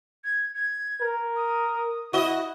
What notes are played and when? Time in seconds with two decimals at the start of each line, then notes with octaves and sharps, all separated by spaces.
0.24 G#6
0.54 G#6
1.01 A#4
1.36 D#6
2.13 E4 F#4 D#5